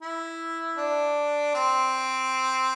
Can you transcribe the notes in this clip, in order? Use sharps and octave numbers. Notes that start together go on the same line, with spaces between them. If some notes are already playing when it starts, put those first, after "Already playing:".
E4
D4
C4